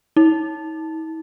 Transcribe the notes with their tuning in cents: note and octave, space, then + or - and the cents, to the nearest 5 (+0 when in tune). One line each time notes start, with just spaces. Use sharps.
D#4 +45